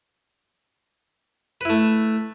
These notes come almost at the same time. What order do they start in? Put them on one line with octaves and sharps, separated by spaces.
B4 E4 A3